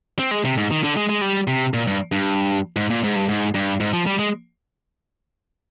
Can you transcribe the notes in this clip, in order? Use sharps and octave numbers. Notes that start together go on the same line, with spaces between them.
C4
G#3
C3
G#2
D#3
D3
G#3
G#3
G3
C3
A#2
G2
G2
G#2
A#2
G#2
G2
G#2
G2
G#2
F3
G3
G#3